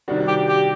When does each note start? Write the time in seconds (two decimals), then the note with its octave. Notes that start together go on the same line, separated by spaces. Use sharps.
0.08 C3 D#3 G3 D4 F#4
0.28 G4
0.48 G4